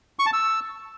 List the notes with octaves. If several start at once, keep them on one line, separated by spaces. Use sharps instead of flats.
C#6
A5
E6